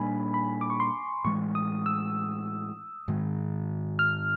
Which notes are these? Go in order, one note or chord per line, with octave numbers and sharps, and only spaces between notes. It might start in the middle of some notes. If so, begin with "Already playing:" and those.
Already playing: A#2 G3 A#3 D4 G#5 B5
B5
D6
C#6
C6
A2 E3 G#3 C#6
D#6
E6
G#2 D#3 G#3
F6